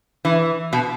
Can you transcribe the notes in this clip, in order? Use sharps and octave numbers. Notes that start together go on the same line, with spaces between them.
E3
B2